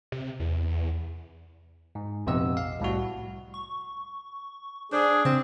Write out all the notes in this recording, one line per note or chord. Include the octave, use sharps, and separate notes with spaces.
C3
E2
G#2
A#1 F2 C3 B3 D#5 E6
F5
C2 A2 G3 F#4
C#6
D4 G#4 C5
C#3 C4